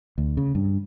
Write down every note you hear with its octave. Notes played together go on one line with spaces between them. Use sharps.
D2
C#3
G2